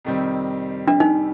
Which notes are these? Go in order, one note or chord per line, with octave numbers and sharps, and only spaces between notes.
F2 C3 D#3 G3 C4
D4
D#4